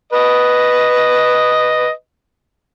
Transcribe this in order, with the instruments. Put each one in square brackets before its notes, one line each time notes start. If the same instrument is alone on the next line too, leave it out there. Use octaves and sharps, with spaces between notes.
[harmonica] B4 D#5